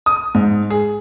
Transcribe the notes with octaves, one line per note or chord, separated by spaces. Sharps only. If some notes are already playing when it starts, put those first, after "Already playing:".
D#6
G#2
G#4